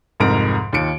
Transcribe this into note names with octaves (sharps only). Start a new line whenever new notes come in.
C2 F2 G#2 A#4 A#5 D7
D#2 D#3 F4 C#7 D7